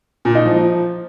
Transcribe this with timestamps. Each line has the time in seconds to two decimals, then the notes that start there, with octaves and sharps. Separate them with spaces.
0.25 A#2
0.35 D#4
0.45 F3